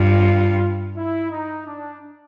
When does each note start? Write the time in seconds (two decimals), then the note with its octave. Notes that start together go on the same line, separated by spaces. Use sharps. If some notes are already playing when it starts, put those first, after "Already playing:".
Already playing: G2 F4
0.97 E4
1.32 D#4
1.67 D4